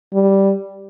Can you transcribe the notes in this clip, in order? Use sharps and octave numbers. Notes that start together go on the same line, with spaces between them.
G3